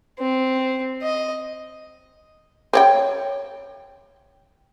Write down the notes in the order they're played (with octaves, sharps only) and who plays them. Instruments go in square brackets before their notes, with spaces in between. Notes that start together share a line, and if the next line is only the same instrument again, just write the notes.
[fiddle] C4
D#5
[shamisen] C4 C#5 G5